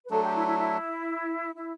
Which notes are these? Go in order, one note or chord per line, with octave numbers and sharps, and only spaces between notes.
B4
F#3 A3 D4 A4
G4
E4
E4
E4
E4